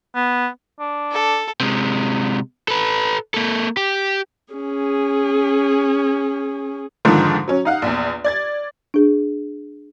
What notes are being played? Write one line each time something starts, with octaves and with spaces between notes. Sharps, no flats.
B3
D4
A4
C3 G#3
A4 B4
A#3 A4
G4
C#4 G#4
F2 G#2 D3 D#3 F3
F#3 C#4
D#4 F5 F#5
A#1 E2
D5 G#6 A6
D4 G#4